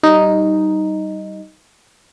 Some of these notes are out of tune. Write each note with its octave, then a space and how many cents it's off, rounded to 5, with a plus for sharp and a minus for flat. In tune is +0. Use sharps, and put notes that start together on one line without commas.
G3 -20 D#4 +0